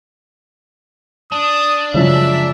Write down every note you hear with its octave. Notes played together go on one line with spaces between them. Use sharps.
D4 D#6
F#2 C#3 F3 G#3 E5